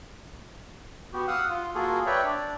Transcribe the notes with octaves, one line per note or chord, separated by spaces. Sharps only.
B3 F#4 G4
F5 F#5 D#6 E6 F#6
F4
A#3 F4 F#4 G#4 A4
B4 C#5 D5 E5 G5
D4 D5